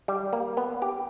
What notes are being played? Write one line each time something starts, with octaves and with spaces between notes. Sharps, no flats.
G3
A#3
B3
G4